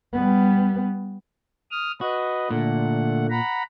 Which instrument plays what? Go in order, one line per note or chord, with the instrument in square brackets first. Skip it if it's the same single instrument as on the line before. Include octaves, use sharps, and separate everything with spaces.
[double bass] G3 B3
[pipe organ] D#6 F6
[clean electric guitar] F#4 [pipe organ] B4 D#5
[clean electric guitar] A#2 [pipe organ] D3 A3 F#5
[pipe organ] F#5 A#5 B5